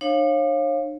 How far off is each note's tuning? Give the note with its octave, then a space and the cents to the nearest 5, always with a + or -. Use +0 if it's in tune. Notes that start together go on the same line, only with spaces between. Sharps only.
D4 +40 C#5 -30 F5 +0